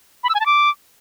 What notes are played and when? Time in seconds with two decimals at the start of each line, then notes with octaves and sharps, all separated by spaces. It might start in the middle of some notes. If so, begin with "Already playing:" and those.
0.24 B5
0.29 E6
0.35 G#5
0.40 A5
0.46 D6